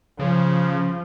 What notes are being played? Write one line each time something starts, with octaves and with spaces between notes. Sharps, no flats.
C#3 F3